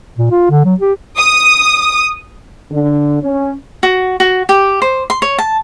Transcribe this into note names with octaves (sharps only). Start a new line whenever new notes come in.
A#2
F4
D3
F#3
G4
D#6
D3
C#4
F#4
F#4
G4
C5
C6
C#5
A5